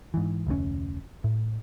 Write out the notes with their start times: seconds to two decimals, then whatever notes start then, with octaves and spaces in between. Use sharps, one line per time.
0.14 G#2 E3
0.47 F1 D2 G#2 C#4
1.24 A2